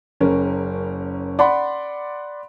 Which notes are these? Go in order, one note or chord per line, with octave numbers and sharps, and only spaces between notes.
F#1 C#4 A#4
D5 F#5 B5 C6